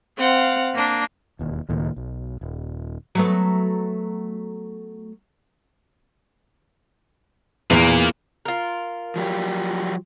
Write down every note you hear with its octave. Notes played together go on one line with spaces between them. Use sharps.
C4 F5 F#5
A#3 D4
E1 D#2
C#2 A2 D#3 A#3
B1
D#1
F#3 A3 B3
E2 A#2 A#3
F4 A#4
F3 F#3 G4